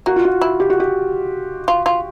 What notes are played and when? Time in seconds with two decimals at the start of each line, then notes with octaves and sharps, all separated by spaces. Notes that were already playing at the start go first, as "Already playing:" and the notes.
0.06 A#3 F#4
0.16 F4
0.25 F#4
0.41 E4
0.60 G4
0.70 F#4
0.80 G4
1.68 F4
1.86 F4